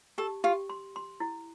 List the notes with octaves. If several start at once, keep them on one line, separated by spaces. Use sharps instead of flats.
G4 A4
F4 G4
C6
C6
E4